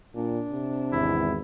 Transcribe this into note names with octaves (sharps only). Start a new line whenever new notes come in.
A#2 D4
C3
G#1 E2 E4